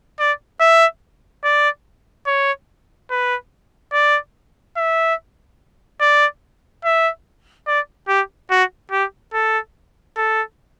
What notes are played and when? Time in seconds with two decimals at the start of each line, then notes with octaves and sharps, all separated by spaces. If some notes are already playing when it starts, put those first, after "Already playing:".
0.20 D5
0.60 E5
1.44 D5
2.27 C#5
3.11 B4
3.93 D5
4.77 E5
6.01 D5
6.85 E5
7.67 D5
8.08 G4
8.51 F#4
8.91 G4
9.34 A4
10.17 A4